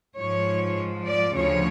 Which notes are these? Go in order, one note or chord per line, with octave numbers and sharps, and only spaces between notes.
G#2 F3 C#5
D5
D2 C#3 F3 C#5